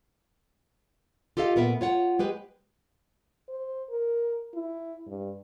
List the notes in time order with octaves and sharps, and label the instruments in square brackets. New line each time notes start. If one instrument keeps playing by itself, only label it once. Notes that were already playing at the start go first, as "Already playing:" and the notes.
[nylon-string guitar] F4 G4 A4 D#5 F5
A#2 B3 A#4 E5
F4 C#5 F#5
G#3 G4 B4
[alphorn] C5
A#4
E4
G2